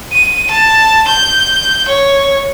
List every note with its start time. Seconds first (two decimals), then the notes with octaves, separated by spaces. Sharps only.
0.13 D#7
0.50 A5
1.08 G6
1.88 C#5